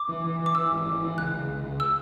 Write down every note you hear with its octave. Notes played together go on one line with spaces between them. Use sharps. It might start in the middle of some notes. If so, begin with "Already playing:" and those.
Already playing: D6
E3
E3
E3
D6
E3 E6
G#1
E3
E3
C#2 F#6
C#2
C#2
C#2
E6